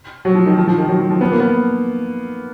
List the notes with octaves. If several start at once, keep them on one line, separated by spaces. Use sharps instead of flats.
F#3
F3
D#3
F3
F3
D#3
F#3
F3
F3
B3
A#3
B3